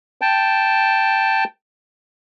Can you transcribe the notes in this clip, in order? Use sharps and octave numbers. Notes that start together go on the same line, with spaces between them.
G5 A5